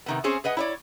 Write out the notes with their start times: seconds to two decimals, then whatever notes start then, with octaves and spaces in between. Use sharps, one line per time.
0.06 C3 D#3 B3
0.24 C4 C#4 G#4 C5 C#5
0.44 G#4 B4 D#5 F#5
0.57 E4 C#5 D5